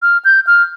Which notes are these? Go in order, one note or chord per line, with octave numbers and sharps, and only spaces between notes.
F6
G6
F6